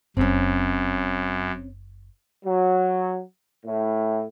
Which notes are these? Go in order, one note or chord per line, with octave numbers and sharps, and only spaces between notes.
F#1 F#2 C4 C#4
F#3
A2